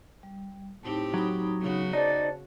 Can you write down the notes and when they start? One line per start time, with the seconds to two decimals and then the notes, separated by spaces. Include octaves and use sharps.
0.23 G3
0.83 A2 C4 D#4 E4 G4 A5
1.14 F#3 D#4 B5 D#6
1.60 C#3 B3 F#4
1.93 D#4 G#4 C5 D5 A5